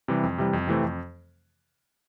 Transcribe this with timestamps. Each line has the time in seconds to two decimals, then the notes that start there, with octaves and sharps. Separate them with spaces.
0.08 C3 E3 G3
0.23 F2
0.38 C3 E3 G3
0.53 F2
0.67 C3 E3 A3 C4
0.83 F2